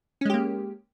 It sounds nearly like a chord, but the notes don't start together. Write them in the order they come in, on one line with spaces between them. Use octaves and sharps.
C#4 G#3 G4 A#3